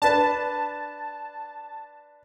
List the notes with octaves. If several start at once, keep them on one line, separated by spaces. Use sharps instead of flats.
D4 B4 A5